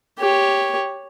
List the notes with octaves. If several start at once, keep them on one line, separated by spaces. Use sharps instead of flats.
G4 C#5